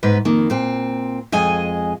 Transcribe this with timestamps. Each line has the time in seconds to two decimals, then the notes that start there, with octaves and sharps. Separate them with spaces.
0.03 G#2 B3 B4
0.25 F2 D#3 A#3
0.50 A#2 C4
1.32 F2 G#3 D#5 G#5